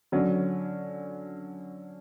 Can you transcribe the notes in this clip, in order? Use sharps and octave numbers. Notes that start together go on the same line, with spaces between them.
D3 F#3 C#4